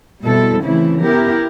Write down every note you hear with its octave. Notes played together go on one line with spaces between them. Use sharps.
B2 G3 C4 E4 A4
C#3 E3 A3 C4 E4
B3 E4 G4 A#4